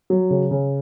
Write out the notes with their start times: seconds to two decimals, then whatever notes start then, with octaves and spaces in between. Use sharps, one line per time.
0.10 F#3
0.30 C#3
0.51 C#3